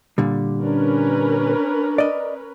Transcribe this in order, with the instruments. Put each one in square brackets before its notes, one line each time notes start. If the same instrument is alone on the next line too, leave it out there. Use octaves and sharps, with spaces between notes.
[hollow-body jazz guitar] A#2 D3 G3
[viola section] C#4 A#4 B4 [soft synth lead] D4
[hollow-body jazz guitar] D5 D#5